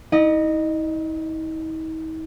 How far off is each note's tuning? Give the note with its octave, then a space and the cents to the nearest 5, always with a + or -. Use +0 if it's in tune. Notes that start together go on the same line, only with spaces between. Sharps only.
D#4 +45 D#5 -20